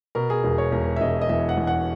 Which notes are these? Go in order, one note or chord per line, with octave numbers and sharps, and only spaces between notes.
B2 A#4
G#4
E1 A#4
C#5
E1 A#4
E5
E1 D#5
D#5
E2 E5
F#5
E2
F#5